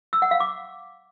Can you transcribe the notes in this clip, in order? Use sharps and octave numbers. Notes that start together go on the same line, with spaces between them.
E6
F#5
F5
D6